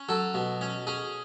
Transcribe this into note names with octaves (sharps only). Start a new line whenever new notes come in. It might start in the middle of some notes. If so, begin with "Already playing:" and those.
Already playing: C#4
F#3 A4
B2
C#4
C#4 G#4